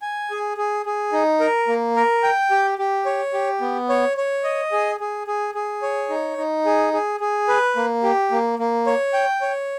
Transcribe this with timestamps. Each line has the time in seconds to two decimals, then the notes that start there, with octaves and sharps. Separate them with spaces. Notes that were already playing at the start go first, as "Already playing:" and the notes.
0.02 G#5
0.31 G#4
0.57 G#4
0.86 G#4
1.13 D#4
1.40 A#4
1.68 A#3
1.96 A#4
2.23 G5
2.51 G4
2.78 G4
3.06 C#5
3.34 G4
3.61 B3
3.89 C#5
4.17 C#5
4.44 D#5
4.72 G#4
5.00 G#4
5.27 G#4
5.55 G#4
5.82 C#5
6.10 D#4
6.38 D#4
6.65 G#4
6.93 G#4
7.20 G#4
7.48 B4
7.76 A#3
8.03 G4
8.31 A#3
8.59 A#3
8.87 C#5
9.13 G5
9.41 C#5